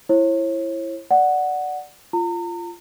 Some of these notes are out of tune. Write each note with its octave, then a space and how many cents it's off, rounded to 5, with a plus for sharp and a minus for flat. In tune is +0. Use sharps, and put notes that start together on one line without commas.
E4 +15 C#5 -40
D5 +0 F#5 +0
F4 -15 A#5 -35